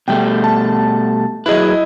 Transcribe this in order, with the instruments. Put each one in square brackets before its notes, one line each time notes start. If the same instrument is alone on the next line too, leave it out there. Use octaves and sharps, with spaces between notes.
[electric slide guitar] B2 G3 A3 [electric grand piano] G5
[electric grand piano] A5
[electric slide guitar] F#3 G#4 B4 [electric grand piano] E4 D#5